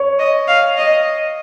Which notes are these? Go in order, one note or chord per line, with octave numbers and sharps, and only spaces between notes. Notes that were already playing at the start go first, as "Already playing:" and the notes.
Already playing: C#5
D#5
F5
D#5